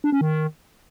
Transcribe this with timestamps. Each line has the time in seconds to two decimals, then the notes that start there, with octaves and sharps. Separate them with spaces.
0.04 D4
0.12 C#4
0.21 D#3